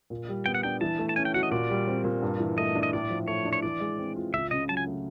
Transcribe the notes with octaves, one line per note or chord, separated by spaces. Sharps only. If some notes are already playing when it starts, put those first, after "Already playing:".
A#2
G3
B3 G5
F#5
D4 G5
E3 A5
A3
A5
C#4 G#5
G5
F#4 F#5
D#5
A#2 D5
G3
C4
A#2
G2
E3
A3 D#5
D4
D#5
A2 D5
F3
A3 C#5
D4
C#5
E3 D5
G#3
C4
F4
C#2 E5
C#3 D#5
F#3 A5
G#5
A3